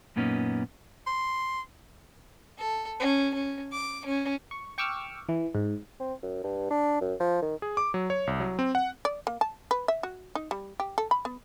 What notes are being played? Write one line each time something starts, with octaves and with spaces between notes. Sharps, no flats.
F#2 A#2 A#3 B3 C#4 D#4
C6
A4
C#4
C#4
D6
C#4
C#6
G5 C#6 D6 E6 F6
E3
G#2
C4
F#2
G2
D4
F#2
F3
D#3
G#4
D6
F#3
C#5
C2
F#3
C4
F#5
D5
A#3
A5
B4
E5
F#4
D#4
G3
G4
A4
B5
B3